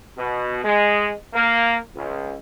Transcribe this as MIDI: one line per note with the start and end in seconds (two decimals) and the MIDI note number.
0.17 0.63 47
0.63 1.12 56
1.34 1.77 58
1.95 2.35 37